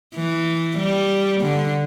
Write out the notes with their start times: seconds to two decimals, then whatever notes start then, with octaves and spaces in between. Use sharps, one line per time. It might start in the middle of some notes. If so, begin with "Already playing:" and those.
0.16 E3
0.78 G3
1.42 D3